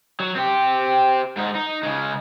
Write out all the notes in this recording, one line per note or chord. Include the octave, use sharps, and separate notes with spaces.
F#3
C4 G4
G#2 D#4
D#4
C#3 G#3